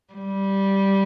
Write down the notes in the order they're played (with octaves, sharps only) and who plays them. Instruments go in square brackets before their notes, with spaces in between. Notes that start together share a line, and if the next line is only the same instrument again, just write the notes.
[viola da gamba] G3